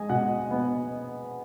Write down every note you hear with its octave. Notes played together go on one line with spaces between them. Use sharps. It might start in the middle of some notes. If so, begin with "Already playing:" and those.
Already playing: G#3 D#5 G#5
B2 F#5
B3